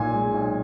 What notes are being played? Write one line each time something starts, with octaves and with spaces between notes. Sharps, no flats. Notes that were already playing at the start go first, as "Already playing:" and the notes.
Already playing: B1 A#2 G#5
G#3
B1